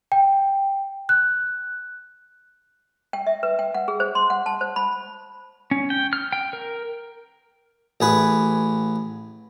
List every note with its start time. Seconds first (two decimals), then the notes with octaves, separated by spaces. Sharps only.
0.12 G5
1.09 F#6
3.13 G5
3.26 E5
3.43 B4
3.59 G5
3.74 F#5
3.88 G#4
4.00 C5
4.15 C6
4.30 F#5
4.46 A5
4.61 C5
4.76 B5
5.71 C#4
5.90 G5
6.13 F6
6.32 G5
6.53 A#4
8.01 A1 G#4 B4